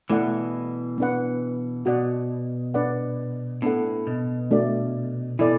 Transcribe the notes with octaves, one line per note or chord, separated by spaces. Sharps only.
B2 E3 A3 E4 D5 F#5
B3 D4 B4 F#5
B2 F#4 D5 F#5
D4 B4 D5 F#5
A2 B3 D4 A4 F#5
B2
A3 D4 F#4 D5
B2 E3 E4 A4 D5